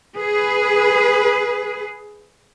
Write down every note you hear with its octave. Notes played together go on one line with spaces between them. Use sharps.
G#4 B4